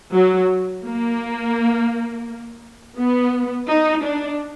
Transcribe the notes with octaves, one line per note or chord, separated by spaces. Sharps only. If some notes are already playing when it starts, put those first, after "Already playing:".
F#3
A#3
B3
D#4
D4